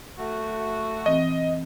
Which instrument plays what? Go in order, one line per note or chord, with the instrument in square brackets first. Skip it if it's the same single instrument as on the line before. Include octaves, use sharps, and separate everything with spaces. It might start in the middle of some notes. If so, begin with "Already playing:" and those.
[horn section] A3 F#4
[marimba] E3 C4 [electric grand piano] D#5